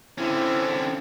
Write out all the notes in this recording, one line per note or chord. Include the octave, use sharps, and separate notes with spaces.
D3 C4 C#4 E4